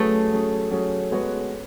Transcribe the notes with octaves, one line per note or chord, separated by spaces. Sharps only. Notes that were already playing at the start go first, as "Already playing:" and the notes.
Already playing: F#3 A3 C#4 G#4 B4
F#3 C#4 G#4
F#3 C#4 G#4
G#3 B3 F#4 C#5